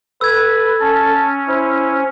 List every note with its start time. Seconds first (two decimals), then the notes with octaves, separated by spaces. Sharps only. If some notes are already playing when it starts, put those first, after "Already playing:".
0.21 A4 B4 E6 G#6
0.80 C#4 A5
1.48 E4 C5